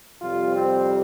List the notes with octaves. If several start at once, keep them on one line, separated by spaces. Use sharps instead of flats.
F2 C3 G3 F4
C4